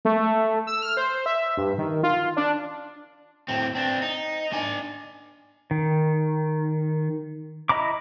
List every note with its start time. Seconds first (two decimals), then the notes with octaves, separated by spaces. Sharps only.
0.05 A3
0.22 A3
0.67 E6
0.82 F6
0.97 C5
1.26 E5
1.57 G2
1.78 D#3
2.03 F4
2.36 D4
3.48 A2 C4
3.75 C4 D4
4.02 D#4
4.52 D4 G#5
5.71 D#3
7.69 E4 D#5 A#5 B5 D6